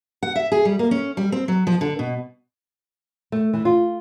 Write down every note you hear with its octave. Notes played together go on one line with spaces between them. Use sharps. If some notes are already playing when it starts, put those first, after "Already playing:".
F#5
E5
G#4
G3
A#3
C#4
G3
C4
F#3
F3
D3
B2
A3
E3
F4